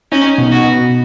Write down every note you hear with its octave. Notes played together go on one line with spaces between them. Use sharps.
C#4 D#4
B2
F#4
B2